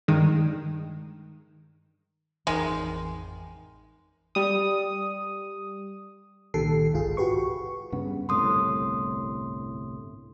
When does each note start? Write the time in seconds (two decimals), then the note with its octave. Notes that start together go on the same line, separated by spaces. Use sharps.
0.08 G2 D#3 G#3
2.47 A1 F2 D#3 E3 G#3
4.35 G3 D#6
6.54 C2 A#2 D#3 G4 A4 C7
6.93 G1 C2 G#2 F4 G#4
7.17 F#4 G4 B4 C#6
7.92 G2 C#3 B3
8.29 G1 C2 A2 C6 D#6